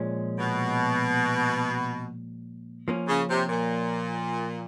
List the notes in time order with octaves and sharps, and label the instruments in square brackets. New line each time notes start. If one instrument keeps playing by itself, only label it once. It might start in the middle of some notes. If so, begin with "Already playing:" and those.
Already playing: [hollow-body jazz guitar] A#2 F3 G#3 C#4
[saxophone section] B2
[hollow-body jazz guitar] F3 A#3 C#4
[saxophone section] C#3
C3
A#2